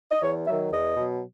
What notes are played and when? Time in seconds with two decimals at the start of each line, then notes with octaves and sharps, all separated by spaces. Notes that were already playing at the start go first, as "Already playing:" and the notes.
0.12 D#5
0.22 E2 C#5
0.47 D#3 F#3 E5
0.72 E2 D#5
0.97 B2 F#3